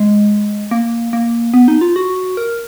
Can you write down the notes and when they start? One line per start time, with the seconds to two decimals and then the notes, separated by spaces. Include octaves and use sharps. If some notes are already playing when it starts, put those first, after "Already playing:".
Already playing: G#3
0.71 A#3
1.13 A#3
1.54 B3
1.68 D#4
1.81 F4
1.96 F#4
2.37 A#4